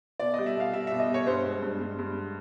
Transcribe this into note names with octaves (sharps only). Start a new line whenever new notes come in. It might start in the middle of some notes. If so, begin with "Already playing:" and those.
B2 D5
G3 D#5
E5
B2 F5
G3 E5
B2 E5
D#5
G3 C#5
G2 C5
G#3
G2
G2
G2